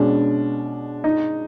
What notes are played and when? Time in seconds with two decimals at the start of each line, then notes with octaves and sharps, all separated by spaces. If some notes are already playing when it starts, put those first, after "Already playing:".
Already playing: B2 G#3 C#4 D4
1.04 D#4